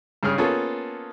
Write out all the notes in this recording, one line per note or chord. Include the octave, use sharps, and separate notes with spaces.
G2 C#3 G#4 F6
A#3 B3 C#4 F4 G#4 A4